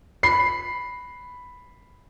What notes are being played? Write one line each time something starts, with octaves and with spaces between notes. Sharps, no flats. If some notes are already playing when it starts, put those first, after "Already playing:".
B5 C7